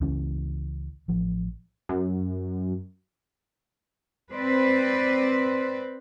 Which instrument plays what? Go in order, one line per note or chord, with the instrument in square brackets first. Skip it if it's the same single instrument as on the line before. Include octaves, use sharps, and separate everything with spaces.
[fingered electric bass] C#2 C#3 E3 C#4
A1 F3
[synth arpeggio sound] F#2
[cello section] C4 B4 C5 D5